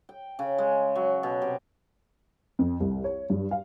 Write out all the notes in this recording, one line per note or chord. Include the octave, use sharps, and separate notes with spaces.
G5
C#3
G#3
F#3
B2
C3
F2
C2
C#5
G2
F5